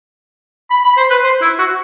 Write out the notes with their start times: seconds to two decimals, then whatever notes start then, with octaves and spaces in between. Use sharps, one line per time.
0.71 B5
0.84 B5
0.97 C5
1.10 B4
1.23 C5
1.41 E4
1.59 F#4